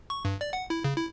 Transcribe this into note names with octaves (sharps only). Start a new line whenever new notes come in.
C#6
G2
D5
F#5
E4
C#3
E4